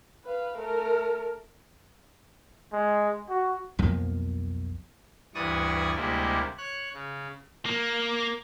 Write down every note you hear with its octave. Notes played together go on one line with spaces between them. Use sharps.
B4 F5
A3 A#4
G#3
F#4
B1 F2 F3 A#3
D2 G2 E3 D5 C#6 D#6
D2 C3 G3 G#3 A#3 E4
C#5 F#6
C#3
A#3